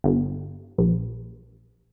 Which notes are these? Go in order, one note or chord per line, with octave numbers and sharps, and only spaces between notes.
G1
A#1